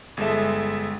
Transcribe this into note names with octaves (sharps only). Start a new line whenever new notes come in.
G1 G#3 A4 E5